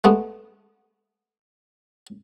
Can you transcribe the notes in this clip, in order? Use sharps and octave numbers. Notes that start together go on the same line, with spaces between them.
G#3 A3 B3